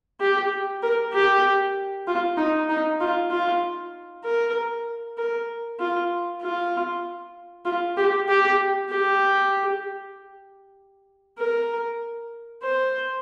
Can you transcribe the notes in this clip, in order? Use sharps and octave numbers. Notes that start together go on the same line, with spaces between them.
G4
A#4
G4
F4
D#4
D#4
F4
F4
A#4
A#4
F4
F4
F4
G4
G4
G4
A#4
C5